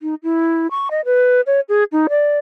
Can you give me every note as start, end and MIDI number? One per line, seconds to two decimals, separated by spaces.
0.01 0.15 63
0.23 0.67 64
0.71 0.89 85
0.91 1.01 75
1.05 1.41 71
1.47 1.60 73
1.69 1.84 68
1.92 2.07 63
2.09 2.39 74